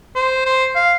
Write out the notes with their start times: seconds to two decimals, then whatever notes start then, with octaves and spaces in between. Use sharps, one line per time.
0.15 C5
0.45 C5
0.75 F5